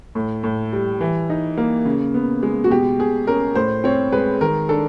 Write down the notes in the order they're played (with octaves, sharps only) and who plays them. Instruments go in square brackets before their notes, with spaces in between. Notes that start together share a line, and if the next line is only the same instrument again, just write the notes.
[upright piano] A2
A2
G3
E3
D#4
A#3
C#3
B3
G#3
F#4
B2 G4
B2 G#4
C#4 A#4
A2 C5
C4 C#5
G#3 B4
D#3 A#4
D4 A4